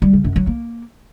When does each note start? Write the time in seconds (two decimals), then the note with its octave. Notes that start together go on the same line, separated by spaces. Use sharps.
0.02 G3
0.13 C#3
0.24 F#2
0.36 F#3
0.47 A#3